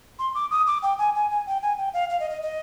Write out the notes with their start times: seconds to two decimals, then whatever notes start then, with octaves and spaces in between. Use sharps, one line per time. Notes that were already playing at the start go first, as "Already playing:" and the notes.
0.19 C6
0.35 D6
0.51 D#6
0.67 D6
0.83 G5
0.99 G#5
1.15 G#5
1.30 G#5
1.47 G5
1.62 G#5
1.78 G5
1.94 F5
2.10 F5
2.20 D#5
2.31 D#5
2.42 D#5